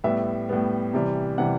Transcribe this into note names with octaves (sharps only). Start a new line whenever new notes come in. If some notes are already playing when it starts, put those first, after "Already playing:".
A2 G3 B3 E5
A2 G3 B3
C3 E3 G3
C3 E3 G3 F#5